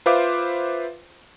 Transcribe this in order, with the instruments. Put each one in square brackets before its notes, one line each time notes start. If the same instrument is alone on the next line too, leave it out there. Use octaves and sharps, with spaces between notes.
[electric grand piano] F4 B4 C5 E5 F5 D6